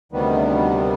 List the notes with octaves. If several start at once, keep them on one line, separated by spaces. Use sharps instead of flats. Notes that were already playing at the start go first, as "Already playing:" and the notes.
D2 C3 D#3 G3 B3